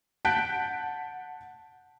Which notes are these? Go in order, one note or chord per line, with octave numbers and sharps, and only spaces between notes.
F#5 A5 F#6 G6 B6 D7